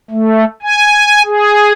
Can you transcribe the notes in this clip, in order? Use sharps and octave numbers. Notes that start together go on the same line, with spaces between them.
A3
G#5
G#4